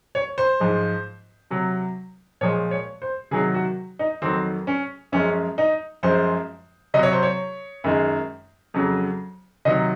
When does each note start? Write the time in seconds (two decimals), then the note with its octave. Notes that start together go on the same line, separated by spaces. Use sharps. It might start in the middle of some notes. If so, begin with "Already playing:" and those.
0.15 C#5
0.38 C5
0.60 G#2 F3 G#3
1.50 C3 F#3
2.41 A#2 F3 G#3 C#5
2.71 C#5
3.02 C5
3.31 C3 D#3 F#3 G#4
3.54 F#4
3.99 D#4
4.22 F2 D#3 F#3 C4
4.67 C#4
5.12 F#2 F3 G#3 C#4
5.58 D#4
6.03 F#2 F3 G#3 C5
6.94 C3 F#3 D#5
7.03 C#5
7.13 C5
7.23 C#5
7.84 F#2 D#3 G#3
8.74 F2 C#3 F#3
9.65 C3 D#3 F#3 D#5